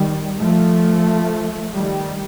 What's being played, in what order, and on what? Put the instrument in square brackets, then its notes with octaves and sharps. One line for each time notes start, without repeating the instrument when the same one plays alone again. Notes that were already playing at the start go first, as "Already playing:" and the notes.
Already playing: [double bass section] D#3 G3
F3 A3
D#3 G3